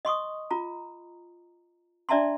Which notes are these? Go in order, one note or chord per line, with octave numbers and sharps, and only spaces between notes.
D#5 C6 C#6 D#6
F4 A#5
D4 D5 E5 A5 A#5 C6